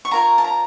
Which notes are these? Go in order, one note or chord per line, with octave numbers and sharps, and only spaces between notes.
C#6
F4 A#4 C#5 A#5
A5
A#5